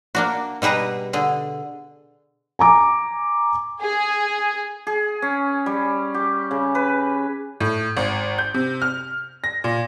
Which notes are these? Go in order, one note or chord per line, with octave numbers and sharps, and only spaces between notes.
A#3 D4 F#4
B2 G3 G#4 B4 A#5
D3 G#4
G#5 A#5 D6
G#4
G#4
C#4
G3
G4
C#3
B4
A2
G#1
G6
C3
F6
A#6
A#2